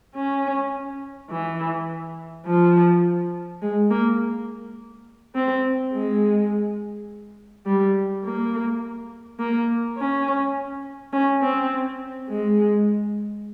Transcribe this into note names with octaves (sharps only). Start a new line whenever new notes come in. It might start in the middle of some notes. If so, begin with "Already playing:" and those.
C#4
E3
F3
G#3
A#3
C4
G#3
G3
A#3
A#3
C#4
C#4
C4
G#3